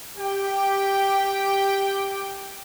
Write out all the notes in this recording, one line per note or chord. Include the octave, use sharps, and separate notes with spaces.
G4 G5